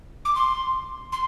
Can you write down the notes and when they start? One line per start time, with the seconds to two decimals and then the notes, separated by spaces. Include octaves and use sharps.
0.25 D6
0.35 C6
1.12 C6